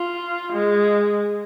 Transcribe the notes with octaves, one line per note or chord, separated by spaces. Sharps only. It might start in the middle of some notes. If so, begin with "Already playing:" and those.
Already playing: F4
G#3